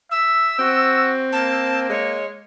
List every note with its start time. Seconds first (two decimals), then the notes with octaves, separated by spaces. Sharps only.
0.11 E5 E6
0.59 C4 F#4
1.32 A#3 A5
1.90 G#3 C#5